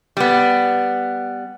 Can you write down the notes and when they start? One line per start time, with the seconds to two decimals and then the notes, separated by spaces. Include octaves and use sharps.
0.17 G3 B3